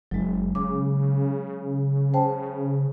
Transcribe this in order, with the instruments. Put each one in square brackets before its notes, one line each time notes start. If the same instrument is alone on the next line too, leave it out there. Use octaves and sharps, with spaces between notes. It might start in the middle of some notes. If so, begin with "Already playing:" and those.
[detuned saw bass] F#1 [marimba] F#3 G#3
[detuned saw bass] C#3 [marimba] D6
[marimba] C5 G5 A5